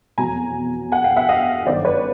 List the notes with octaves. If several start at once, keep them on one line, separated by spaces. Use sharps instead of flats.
F1 E2 B2 F#3 G#5 A#5
F#5 G#5
F5 G5
E5 F#5
D#5 F5
G1 F#2 D#3 C5 D5
B4 C#5